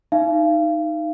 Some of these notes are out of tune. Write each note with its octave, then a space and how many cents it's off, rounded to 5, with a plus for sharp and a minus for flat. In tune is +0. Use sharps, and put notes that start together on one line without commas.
D#4 +0 F5 -35